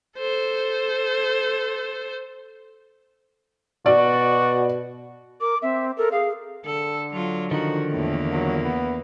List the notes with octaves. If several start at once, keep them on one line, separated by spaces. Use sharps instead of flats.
A4 C5
B2 F#4 D5
A#4 D6
C4 E5
A4 A#4
G#4 F5
D3 A4
F#3 F4
D3 D#3 F3 D#4 F#4
E2 A2 A#3
F#3
B3